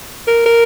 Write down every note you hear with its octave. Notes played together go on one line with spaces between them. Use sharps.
A#4
A#4